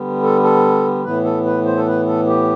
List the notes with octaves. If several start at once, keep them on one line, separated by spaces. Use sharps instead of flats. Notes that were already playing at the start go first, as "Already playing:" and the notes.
Already playing: D3 G3 B3
A4
A4
A2 E3 B3 B4
A4
B4
C5
A4
B4
A4
G4